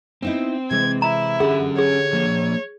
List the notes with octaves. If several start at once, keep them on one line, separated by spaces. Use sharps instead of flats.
B3 C4 D#4 E4
C3 E3 G#3 G#6
E4 A#5
D3 C#4 G4 G#4 F#5
G#4 C#5
F3 A#3